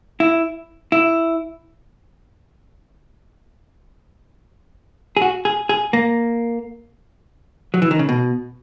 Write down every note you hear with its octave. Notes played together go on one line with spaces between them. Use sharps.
E4
E4
G#4
F#4
G#4
G#4
A#3
F#3
E3
D#3
C#3
B2